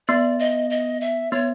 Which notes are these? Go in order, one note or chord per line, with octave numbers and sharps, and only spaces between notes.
B3 D5
D#5
D#5
E5
B3 C#5